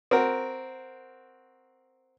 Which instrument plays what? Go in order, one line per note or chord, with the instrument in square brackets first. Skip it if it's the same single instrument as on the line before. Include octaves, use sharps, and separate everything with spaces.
[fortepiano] C4 F#4 A#4